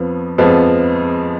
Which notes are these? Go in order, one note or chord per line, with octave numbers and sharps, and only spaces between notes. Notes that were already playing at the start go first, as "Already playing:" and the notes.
Already playing: F2 F3 B3
F2 F3 G#3 B3